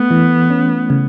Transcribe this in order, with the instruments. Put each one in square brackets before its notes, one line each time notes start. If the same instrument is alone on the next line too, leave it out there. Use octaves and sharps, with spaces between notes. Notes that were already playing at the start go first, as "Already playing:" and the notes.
Already playing: [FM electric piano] A3 [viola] B3
[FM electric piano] E3
C#4
C#3